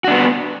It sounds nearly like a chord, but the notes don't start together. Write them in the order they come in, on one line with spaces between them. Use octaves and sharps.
F#4 D4 B3